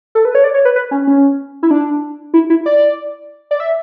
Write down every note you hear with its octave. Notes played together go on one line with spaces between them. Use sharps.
A4
B4
C#5
D5
C#5
B4
B4
C#4
C#4
E4
D4
E4
E4
D5
D5
E5